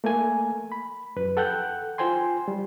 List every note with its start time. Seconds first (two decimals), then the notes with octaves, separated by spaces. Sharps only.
0.04 A3 A#3 A#4 G#5
0.72 B5
1.16 F#2 B4
1.37 A4 F#5 G5 F#6 G6
1.98 F4 C5 G5 G#5 C6
2.48 G3